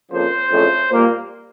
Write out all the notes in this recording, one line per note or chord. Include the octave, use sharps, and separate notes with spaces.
F2 C#3 F3 A#3 C5
F2 C#3 E3 A3
A#2 G3 A#3